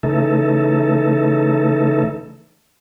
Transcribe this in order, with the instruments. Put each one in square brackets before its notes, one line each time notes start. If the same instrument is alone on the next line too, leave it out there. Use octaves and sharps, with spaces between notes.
[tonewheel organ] C#3 E3 A3 D#4 A4